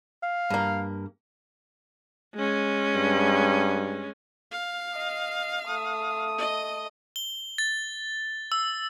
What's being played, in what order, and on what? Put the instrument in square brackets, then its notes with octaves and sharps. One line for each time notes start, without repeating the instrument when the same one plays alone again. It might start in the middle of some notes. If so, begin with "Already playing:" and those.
[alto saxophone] F5
[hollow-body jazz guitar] G2 A#3
[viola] G#3 C#4
[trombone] G2
[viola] F5
[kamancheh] D#5
A3 D#6
[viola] D#5
[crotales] G7
A6
E6